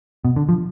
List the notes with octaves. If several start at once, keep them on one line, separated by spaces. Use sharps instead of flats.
B2
D3
F3